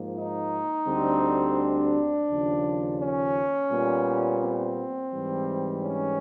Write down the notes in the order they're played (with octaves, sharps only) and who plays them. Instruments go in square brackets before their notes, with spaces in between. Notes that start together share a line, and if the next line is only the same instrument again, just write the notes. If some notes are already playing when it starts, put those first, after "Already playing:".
Already playing: [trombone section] G#2 F3 A#3
D#4
D2 D3 G3 C4
D4
D#2 C#3 F3
C#4
A#2 G3 B3
C4
G#2 E3 G3
C#4